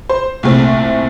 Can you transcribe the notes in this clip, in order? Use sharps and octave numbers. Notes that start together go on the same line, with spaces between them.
C5
C2 A#2 A3 C4